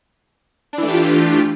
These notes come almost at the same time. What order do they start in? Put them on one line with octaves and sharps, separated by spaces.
D4 E3 A3 G4 F4